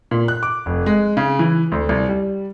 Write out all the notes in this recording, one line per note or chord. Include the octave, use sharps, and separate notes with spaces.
A#2
F#6
D6
F1
G#3
C#3
E3
D2
C2
G3